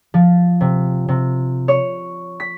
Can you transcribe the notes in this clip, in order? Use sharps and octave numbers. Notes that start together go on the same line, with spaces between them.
F3
C3
C3
C#5
B6